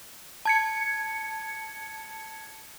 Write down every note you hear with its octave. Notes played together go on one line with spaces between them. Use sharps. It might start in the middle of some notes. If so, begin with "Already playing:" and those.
A5 G#6 C#7